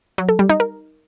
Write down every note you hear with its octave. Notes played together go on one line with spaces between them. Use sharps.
F#3
A4
G3
D#4
A#4